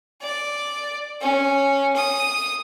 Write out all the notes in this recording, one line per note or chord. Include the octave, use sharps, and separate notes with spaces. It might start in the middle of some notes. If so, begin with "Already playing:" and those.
D5
C#4
D#6